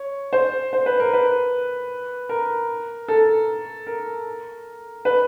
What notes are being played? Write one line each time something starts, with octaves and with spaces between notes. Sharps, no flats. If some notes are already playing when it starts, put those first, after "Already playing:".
Already playing: C#5
C5
C5
B4
A#4
B4
A#4
A4
A#4
B4